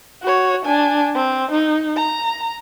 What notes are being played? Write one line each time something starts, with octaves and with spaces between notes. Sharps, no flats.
F#4 C#5
D4 G#5
C4
D#4
A#5